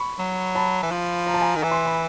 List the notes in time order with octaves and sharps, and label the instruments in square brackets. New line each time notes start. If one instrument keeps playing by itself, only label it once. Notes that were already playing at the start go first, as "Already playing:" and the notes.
Already playing: [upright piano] B5 C#6
[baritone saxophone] F#3
[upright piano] A5 B5
[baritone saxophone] E3
F3
[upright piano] A#5
A5
G#5 A#5
[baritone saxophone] D#3
E3
[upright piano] C6
B5